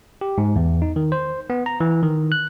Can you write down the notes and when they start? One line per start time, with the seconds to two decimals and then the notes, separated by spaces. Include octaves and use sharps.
0.21 G4
0.38 G#2
0.56 E2
0.82 D#4
0.96 D#3
1.12 C5
1.50 B3
1.66 A#5
1.80 E3
2.03 D#3
2.32 F#6